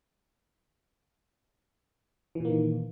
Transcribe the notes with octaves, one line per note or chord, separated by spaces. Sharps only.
A#2 D#3 E3 A#3